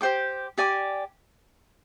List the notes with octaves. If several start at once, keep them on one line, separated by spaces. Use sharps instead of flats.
G4 C5 G5 D6
G4 D5 G#5 D6